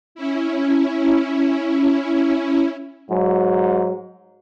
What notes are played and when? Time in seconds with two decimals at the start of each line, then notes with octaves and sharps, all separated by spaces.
0.15 C#4 E4
3.10 G#2 F#3